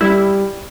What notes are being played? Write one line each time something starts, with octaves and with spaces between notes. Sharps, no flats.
G3 E4